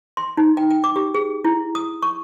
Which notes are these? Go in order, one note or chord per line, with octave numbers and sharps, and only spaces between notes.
C6
D#4
G5
G5
D6
G4
G#4
E4
D#6
C#6